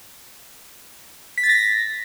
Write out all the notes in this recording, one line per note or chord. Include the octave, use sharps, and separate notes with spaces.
B6
A6
A#6
B6